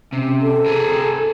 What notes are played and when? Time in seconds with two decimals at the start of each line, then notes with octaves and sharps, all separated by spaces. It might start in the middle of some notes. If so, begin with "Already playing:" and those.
0.13 C3 C#4
0.41 A4
0.66 G#4 A#4